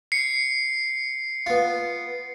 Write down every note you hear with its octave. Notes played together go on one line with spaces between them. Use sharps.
C7 C#7
B3 F4